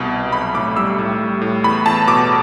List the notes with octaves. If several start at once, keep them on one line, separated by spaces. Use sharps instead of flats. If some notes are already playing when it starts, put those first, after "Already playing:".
Already playing: C2 B2
C2
B1 B5
A2 D6
G3 E6
A2
G3
A2
E2 B5
E2 A5
B2 D6